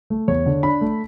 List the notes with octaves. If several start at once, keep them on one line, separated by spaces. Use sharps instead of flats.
A3
E2 C#5
D3
D4 B5
A3